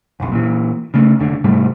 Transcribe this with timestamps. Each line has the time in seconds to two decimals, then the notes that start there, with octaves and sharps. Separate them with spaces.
0.20 F1 B1
0.32 A#2 E3
0.94 C#3 A3
1.19 F1 D3
1.44 G#2 C3 G3 A3